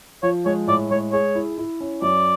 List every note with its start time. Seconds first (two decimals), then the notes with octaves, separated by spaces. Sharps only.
0.23 F3 C#5
0.45 G#3 C#5
0.68 A2 D5
0.91 G#3 C#5
1.12 G#4 C#5
1.35 E4
1.58 E4
1.81 C#4
2.02 F#2 D5